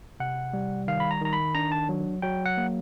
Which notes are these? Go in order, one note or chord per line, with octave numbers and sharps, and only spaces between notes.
C3 F#5
G3
D#3 F5
B5
A#5
D#3 A#5
B5
D4 A#5
A5
F#3
F#3 G5
F#5
A#3